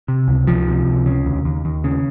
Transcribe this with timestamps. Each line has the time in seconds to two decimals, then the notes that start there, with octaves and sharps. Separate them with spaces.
0.08 C3
0.28 C#2
0.47 C#2 F3
0.68 C3
0.87 C#2
1.06 C#3
1.26 D#2
1.45 D#2
1.65 D#2
1.84 C#3